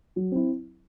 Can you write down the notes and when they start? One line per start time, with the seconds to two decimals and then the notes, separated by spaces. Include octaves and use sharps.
0.16 F#3
0.32 C4 E4